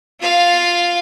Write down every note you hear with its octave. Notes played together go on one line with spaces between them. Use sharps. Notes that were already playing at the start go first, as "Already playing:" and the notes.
F4 F5